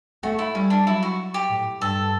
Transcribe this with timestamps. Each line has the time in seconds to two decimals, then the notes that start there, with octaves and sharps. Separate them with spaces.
0.23 A3 F#4
0.39 E4
0.55 G3 C#4
0.70 D4
0.86 F#3 E4
1.03 F#4
1.34 G4
1.49 A2
1.81 G2 A4